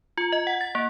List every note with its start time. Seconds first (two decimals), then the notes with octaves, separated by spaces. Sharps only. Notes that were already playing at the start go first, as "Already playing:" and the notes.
0.17 F4
0.32 D#5
0.47 F#5
0.61 A6
0.75 A#3